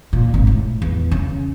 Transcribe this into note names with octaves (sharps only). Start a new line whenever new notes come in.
A#2
G#1
A2
E2
C#3